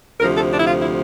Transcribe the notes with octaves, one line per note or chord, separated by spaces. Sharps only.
D2 C3 F3 A#4
A4
D4
E4
F4
E4